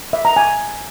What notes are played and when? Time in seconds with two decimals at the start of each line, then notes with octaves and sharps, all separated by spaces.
0.13 E5
0.25 A#5
0.36 G#5